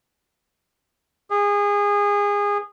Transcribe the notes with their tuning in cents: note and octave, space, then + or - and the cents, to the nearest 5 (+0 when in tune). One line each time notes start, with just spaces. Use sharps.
G#4 -25